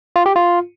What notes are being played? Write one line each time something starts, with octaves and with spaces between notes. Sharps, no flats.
F4
G4
F4